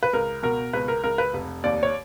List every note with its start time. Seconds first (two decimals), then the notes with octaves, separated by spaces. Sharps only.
0.03 B4
0.13 C#2 A#4
0.43 B2 A#4
0.73 C#2 B4
0.88 A#4
1.04 C#2 A#4
1.18 B4
1.34 F1
1.64 D#2 D5
1.83 C#5